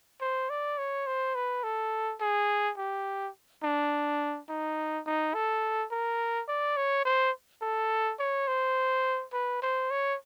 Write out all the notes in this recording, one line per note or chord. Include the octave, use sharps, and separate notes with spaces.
C5
D5
C#5
C5
B4
A4
G#4
G4
D4
D#4
D#4
A4
A#4
D5
C#5
C5
A4
C#5
C5
B4
C5
C#5